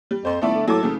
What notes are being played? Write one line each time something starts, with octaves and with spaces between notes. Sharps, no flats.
G3
F2 C5 C6
D#1 A3 B3 E4 D5
D3
A2 F#3 A4 D6
F#1 C#3 A3